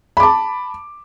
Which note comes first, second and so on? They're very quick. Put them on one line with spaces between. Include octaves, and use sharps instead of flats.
B5 D6 A5